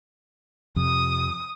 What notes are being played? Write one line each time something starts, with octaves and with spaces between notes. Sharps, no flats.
F2 C3 D#6